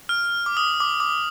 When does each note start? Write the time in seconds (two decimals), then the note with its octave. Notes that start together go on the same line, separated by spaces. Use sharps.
0.09 F6
0.46 D6
0.57 D#6
0.80 D6
1.00 D6